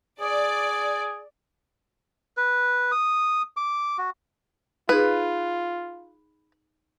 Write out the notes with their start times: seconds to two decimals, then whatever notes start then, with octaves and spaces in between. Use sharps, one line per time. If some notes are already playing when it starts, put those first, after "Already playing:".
0.21 G#4 D5
2.37 B4
2.91 D#6
3.57 D6
3.98 F#4
4.89 D#4 F4 G#4 B4